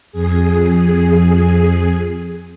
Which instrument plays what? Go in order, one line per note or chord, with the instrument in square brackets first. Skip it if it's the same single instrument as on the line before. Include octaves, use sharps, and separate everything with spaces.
[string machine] F2 G#4